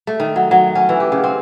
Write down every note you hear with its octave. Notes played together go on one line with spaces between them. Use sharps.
A3
D#3
F#3
F#3
C#4
E3
G4
C#3
C4